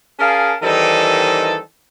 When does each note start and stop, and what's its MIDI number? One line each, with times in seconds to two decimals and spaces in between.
0.19 0.54 61
0.19 0.54 68
0.19 0.54 70
0.19 0.54 77
0.19 0.54 81
0.62 1.58 51
0.62 1.58 52
0.62 1.58 55
0.62 1.58 60
0.62 1.58 63
0.62 1.58 69